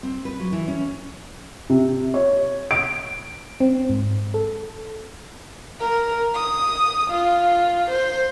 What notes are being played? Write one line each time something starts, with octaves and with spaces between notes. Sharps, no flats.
C4
B4
F#3
E3
C#4
C3
C#5
D7
C4
G#2
A4
A#4
D#6
F4
C5